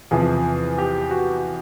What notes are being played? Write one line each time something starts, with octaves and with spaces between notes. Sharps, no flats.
E2 C3 F3 G#4
G4
F#4